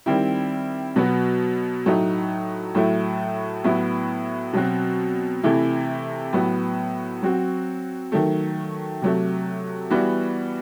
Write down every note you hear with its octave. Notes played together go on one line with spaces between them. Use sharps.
D#3 G3 C4 E4
B2 F#3 B3 F#4
A2 F#3 A3 D#4
A2 F#3 A3 E4
A2 F#3 B3 E4
B2 F#3 C4 F#4
C3 E3 A3 E4
A2 F#3 B3
F#3 C4 F#4
D#3 F#3 A3
C3 F#3 A3
E3 G3 B3 F#4